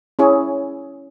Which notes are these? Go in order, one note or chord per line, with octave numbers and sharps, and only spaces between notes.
C#4 E4 G#4 C#5